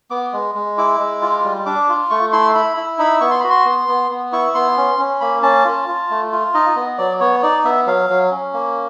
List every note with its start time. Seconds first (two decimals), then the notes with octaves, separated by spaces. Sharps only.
0.11 B3 D6
0.33 G#3
0.55 G#3
0.78 E4 D6
1.00 G#3
1.22 F4
1.44 G3
1.66 D4 D6
1.89 F4
2.10 A3 C#6
2.32 E4 C6
2.55 E4 B5
2.77 E4
2.99 D#4 B5
3.21 B3 C#6
3.31 C6
3.40 F#4 B5
3.50 C6
3.66 B3
3.88 B3
4.11 B3
4.32 E4 C#6
4.55 B3 C6
4.77 C#4
4.99 C#4
5.21 A#3 B5
5.43 C#4 A5
5.65 F4
5.88 F4
6.10 A3
6.32 F4
6.54 D#4 D#5
6.76 B3
6.98 F#3 D5
7.20 B3 C#5
7.43 D#4 D5
7.65 B3 E5
7.87 F#3 F5
8.10 F#3
8.31 C#4
8.54 A#3